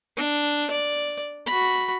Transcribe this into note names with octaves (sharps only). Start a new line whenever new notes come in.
D4
D5
F#4 B5